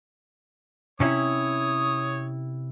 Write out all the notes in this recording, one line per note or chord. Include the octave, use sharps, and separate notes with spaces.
C3 C#4 E4 C#5 D#6